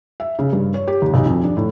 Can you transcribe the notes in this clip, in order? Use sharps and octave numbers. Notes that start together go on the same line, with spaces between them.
E5
C#3
G2
C#5
G4
D#2
B1
F2
D4
A2